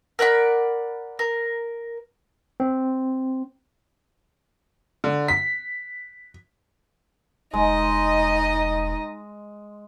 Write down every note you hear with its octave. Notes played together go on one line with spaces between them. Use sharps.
A#4 D5 F#5 B5
A#4
C4
D3
B6
E1 G#3 D#4 D#5